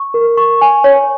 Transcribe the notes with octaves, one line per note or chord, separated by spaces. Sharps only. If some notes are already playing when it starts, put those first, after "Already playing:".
Already playing: C#6
A#4
C#6
G#5
C#5